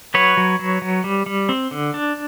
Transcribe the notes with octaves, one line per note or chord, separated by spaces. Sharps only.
F#3 B4 C#5
F#3
F#3
F#3
G3
G3
C4
D3
D4